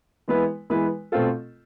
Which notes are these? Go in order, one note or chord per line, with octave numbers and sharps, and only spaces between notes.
E3 G#3 B3 E4 B4
E3 G#3 B3 E4 B4
B2 A3 C4 F4 A4